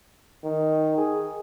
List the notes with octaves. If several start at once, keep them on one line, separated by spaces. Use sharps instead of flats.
D#3
G#4